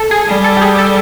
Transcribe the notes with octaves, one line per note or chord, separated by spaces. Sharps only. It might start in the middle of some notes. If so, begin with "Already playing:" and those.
Already playing: A4
G#4
G3
A4
G4
G#4
A4